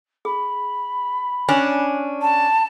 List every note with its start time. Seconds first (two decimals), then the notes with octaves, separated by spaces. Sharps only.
0.25 G#4 B5
1.49 C#4 D4 G#5
2.22 A5